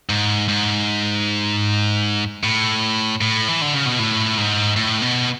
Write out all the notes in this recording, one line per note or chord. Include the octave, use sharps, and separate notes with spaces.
G#2
G#2
A2
A2
E3
D3
C#3
B2
A2
G#2
A2
B2